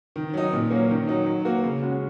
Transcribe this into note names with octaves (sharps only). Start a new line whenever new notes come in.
D#3
F#3 D#4
A#2
F#3 A#3 C#4
D#3
F#3 D#4
F#3
A#3 F#4
C#3
G#3 C#4 F#4